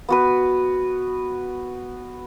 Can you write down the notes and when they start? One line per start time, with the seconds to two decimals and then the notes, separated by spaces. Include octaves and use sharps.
0.09 B3 F#4 B4